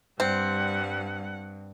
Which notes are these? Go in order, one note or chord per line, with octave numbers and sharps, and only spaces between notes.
G2 G3 C4 F#5